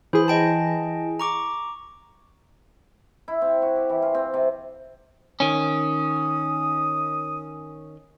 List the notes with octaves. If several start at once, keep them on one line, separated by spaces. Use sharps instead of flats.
E3 G#4 C5 B5
D#5 G5 A5
A#5 C#6 D6
E4
C4
F#4
G4
E3
F4
C4
C3
D#3 C#4 D#6